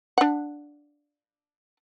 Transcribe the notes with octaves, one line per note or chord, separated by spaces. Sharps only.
D4 F#5